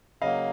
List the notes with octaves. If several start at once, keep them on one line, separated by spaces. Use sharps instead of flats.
C#3 F#3 A#3 D#5 F5